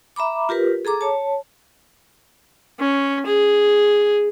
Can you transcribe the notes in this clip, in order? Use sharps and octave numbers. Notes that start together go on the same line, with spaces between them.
E5 A#5 B5 D6
F4 G4 A#4 B4
G#4 A4 A#5 D6
C#5 A5
C#4
G#4